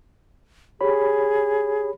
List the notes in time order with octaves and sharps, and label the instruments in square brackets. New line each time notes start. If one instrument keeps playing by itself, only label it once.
[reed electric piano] G4 C#5 B5 [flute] G#4